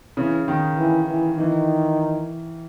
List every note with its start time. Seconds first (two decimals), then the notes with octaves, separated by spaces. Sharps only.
0.17 C#3 E3
0.48 D#3
0.77 E3
1.08 E3
1.38 D#3 E3